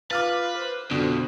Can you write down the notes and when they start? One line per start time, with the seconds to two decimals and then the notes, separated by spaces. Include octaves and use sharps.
0.11 F4 B4 D6 F6 A6
0.56 C5
0.91 F2 B2 D3